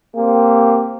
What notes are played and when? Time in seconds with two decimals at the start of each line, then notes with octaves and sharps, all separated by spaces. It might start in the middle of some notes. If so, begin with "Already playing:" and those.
0.15 A#3 C4 G4